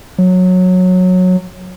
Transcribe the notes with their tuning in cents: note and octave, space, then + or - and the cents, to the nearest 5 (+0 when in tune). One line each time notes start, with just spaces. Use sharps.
F#3 -15